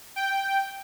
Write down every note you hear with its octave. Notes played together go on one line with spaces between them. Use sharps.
G5